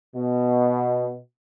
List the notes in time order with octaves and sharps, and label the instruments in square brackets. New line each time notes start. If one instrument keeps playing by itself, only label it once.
[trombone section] B2